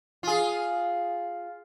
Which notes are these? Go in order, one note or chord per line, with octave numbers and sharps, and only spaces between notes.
F4 G#4